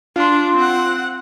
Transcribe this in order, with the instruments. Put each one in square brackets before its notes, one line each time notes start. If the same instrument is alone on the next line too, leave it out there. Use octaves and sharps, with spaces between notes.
[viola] D4 [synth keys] F4 C6
[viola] C4 F#5